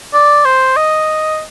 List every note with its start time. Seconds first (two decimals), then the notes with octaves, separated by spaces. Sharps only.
0.14 D5
0.45 C5
0.76 D#5